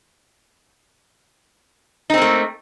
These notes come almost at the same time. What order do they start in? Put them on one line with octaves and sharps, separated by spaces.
D#4 C4 A#3 A3